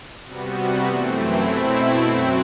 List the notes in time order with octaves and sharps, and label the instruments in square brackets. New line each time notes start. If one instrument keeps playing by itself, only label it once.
[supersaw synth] C3 G3 B3 F#4
F#2 E3 A3 C4
E4
B2 A3 C4
F#2 F#3 C4 F#4